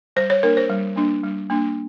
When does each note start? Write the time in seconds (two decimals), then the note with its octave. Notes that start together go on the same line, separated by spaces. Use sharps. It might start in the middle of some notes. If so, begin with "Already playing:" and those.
0.16 G3 C5
0.30 C#5
0.43 A#3 D4 A#4
0.57 C5
0.69 G3
0.96 A#3 D4
1.23 G3
1.50 A#3 D4